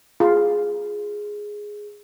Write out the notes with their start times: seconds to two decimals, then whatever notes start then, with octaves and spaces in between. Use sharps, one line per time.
0.20 F4 G#4